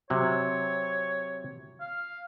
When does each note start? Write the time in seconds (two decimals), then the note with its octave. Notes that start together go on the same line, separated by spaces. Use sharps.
0.10 C3 F#3 C#5
1.80 F5